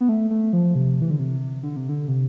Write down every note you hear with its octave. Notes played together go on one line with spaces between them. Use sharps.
B3
A3
A3
F3
C3
E3
D3
C3
D3
C3
D3
C3